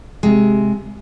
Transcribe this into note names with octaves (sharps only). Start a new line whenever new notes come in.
C3 G#3